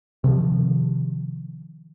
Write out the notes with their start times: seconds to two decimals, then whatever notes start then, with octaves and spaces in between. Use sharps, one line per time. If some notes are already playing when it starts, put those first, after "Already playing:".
0.24 C3 D#3 F3